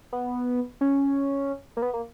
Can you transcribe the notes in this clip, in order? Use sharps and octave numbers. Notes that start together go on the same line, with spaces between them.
B3
C#4
A#3
B3
A#3